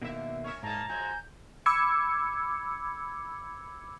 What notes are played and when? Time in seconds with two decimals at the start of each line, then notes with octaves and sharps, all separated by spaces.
0.02 B2 D3 D#3 A#3 E4 E5
0.44 C#4 A#4 E5 C#6
0.63 G#2 A#3 D#4 G#4 A5 A#5
0.89 F3 G#3 F#4 G#5 G6
1.66 B5 D6 E6 G#6 C#7